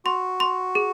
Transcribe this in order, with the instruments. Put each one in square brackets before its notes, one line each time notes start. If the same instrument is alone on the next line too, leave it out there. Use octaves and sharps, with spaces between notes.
[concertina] F#4 [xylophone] C6
[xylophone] C6
G#4